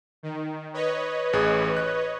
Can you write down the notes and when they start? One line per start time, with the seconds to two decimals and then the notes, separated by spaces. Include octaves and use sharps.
0.23 D#3
0.74 B4 C#5 D#5
1.33 A1 G#4 F#6
1.77 F#6